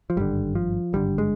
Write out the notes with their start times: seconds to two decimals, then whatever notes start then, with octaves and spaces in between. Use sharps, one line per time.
0.10 F3
0.17 G#1 G2 D3 G3
0.55 F3
0.93 G#1 G2 D3 G3
1.18 G#3